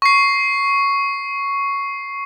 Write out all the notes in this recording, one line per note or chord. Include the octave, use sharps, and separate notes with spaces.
C#6 C7